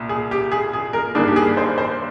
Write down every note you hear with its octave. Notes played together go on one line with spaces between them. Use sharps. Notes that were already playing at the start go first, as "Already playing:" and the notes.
Already playing: C2 A#2
G#4
G4
G#4
G#4
A#4
G2 D#3 A#3 D4 G#4
G4
G#4
C5
C5